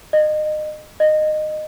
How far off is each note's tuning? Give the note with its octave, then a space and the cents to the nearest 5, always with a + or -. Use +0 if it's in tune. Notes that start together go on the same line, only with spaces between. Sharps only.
D#5 -30
D#5 -20